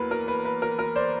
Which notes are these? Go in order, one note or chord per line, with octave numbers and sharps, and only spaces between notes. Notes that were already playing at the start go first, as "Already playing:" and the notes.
Already playing: E2 F#3 A#3 A#4 B4
A#4
B4
B4
A#4
A#4
C5 D5